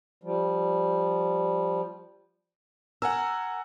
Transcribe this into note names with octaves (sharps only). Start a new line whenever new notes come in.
F3 G3
A#4 F#5 G#5 E6